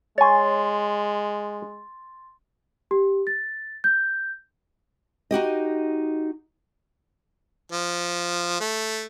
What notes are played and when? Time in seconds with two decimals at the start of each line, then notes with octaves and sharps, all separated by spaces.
0.18 G#3 C#5 G#5 C6 A6
2.91 G4
3.27 A6
3.84 G6
5.31 D#4 F#4 G4 D#5
7.72 F3
8.60 A3